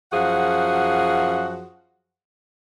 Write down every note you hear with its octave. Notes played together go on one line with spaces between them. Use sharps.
F#2 F3 F#4 G#4 F#5